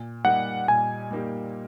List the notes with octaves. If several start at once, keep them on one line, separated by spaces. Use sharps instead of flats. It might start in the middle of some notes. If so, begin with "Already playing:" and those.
Already playing: A#2
G3 A#3 D#4 G4 F#5
A#2 G#5
G3 A#3 D#4 G4